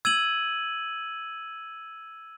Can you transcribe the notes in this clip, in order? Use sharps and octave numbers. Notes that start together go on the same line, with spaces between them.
E6 G#6 D#7 F#7